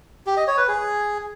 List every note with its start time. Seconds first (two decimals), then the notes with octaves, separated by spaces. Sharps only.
0.26 G4
0.37 D#5
0.47 C#5
0.58 B4
0.68 G#4